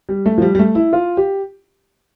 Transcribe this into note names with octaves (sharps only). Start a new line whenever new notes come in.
G3
A3
F3
G3
G3
A3
E4
F4
G4